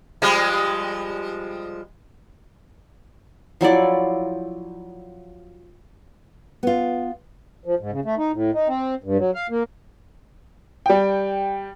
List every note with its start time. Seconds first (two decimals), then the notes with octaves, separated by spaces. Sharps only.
0.22 F3 G3 G#3
3.61 F3 F#3 E4 D5
6.63 B3 F4
7.65 F3
7.80 G#2
7.92 C#3
8.05 A3
8.18 D#4
8.33 A2
8.54 D#4
8.68 C4
9.04 G2
9.19 F#3
9.34 F5
9.50 A#3
10.86 G3 G5